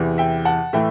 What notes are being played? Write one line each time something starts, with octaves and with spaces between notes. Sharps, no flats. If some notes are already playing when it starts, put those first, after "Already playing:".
Already playing: E2 C3 E3
E5 G5
F#5 A5
A2 E3 A3 E5 G5